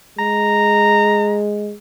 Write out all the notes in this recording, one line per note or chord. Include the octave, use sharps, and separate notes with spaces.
G#3 A#5